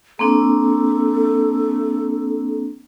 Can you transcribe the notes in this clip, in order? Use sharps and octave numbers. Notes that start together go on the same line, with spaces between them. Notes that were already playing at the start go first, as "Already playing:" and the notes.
A#3 C4 D4 A4